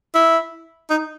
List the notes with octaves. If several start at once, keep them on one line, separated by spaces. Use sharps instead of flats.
E4
D#4